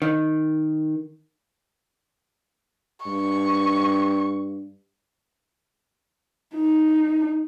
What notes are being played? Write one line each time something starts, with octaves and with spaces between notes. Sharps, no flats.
D#3
G2 C#6
D#4